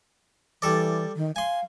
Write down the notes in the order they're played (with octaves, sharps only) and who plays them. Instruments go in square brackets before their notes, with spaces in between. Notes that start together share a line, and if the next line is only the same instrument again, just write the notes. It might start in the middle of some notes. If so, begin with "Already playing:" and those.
[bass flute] E3 [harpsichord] G3 A4 D5
[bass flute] D#3
[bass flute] F5 [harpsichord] G#5 C6